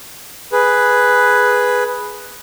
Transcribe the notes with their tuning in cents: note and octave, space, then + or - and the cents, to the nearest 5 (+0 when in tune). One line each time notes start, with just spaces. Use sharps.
G#4 +0 B4 +0